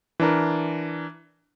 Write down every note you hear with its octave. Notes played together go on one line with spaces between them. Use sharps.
E3 D4 A#4